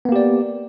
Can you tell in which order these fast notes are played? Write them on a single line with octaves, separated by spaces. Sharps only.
B3 A#3 G4 D5